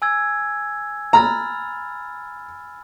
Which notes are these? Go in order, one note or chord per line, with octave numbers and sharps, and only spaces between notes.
G#5 E6 G#6
A#5 B5 F6 A6